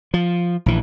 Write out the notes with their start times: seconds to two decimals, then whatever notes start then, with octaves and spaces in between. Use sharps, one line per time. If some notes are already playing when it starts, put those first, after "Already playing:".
0.14 F3
0.66 A#1 E3